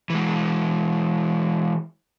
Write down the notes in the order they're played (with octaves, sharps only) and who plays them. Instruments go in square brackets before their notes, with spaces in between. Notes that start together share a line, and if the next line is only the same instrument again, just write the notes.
[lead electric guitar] E3 G#3